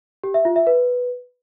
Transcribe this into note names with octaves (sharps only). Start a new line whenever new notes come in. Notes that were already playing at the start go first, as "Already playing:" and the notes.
G4
E5
F4
E5
B4